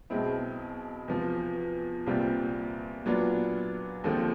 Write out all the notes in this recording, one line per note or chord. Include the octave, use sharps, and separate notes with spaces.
B1 B2 G#3 C4 E4
E2 C3 F3
C2 A#2 G3 C4 F4
A#2 F#3 B3 D4 F4
D#2 D3 F3 A3 C4